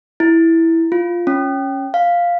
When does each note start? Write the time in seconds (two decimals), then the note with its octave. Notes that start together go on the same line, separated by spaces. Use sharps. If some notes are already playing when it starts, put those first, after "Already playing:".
0.20 E4
0.92 F4
1.27 C#4
1.94 F5